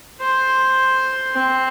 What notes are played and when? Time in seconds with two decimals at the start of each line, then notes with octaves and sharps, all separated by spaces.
0.21 C5
1.32 C4